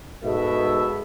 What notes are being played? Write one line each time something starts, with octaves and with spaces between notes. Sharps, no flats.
G#2 B2 A4 E5